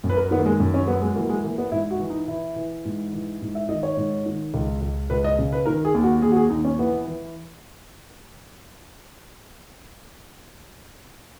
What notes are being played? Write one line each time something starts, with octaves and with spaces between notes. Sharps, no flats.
F#2
B4
A#4
D#3 B3
A#3
G#3
F#2 A#3
C#4
F#3 B3
G#3
E3 A#3
G#3
E3 A#3
B3
G#2 E4
F#4
E3
D#4
E3 E4
E3
G#2
E3
G#2
E5
D#3 D#5
C#5
G#2
D#3
C#2
C#2
C#2 B4
D#5
C#3
B4
D#3 A#4
G#4
D#2
F#4
D#2 G#4
F#4
G#4
D#2 D#4
C#4
E3 B3
E3